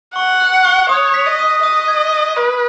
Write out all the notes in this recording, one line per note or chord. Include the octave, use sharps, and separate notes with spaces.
F#5 C#6
F#6
C#6
C#5 D#6
B6
D#5
D#6
D#5 D#6
G#6
D#6
B4 D#6